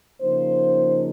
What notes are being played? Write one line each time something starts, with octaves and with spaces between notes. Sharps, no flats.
C#3 F3 A#3 D#4 C5